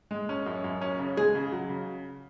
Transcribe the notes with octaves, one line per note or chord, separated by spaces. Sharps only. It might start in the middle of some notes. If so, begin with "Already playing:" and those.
G#3
C#4
F#2
F#2
C#4
C#3
G#3 G#4
C#3
F#3
C#3